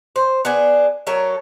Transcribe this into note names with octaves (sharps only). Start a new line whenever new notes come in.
C5
B3 D4 G#4
F#3 A3 A#4 C#5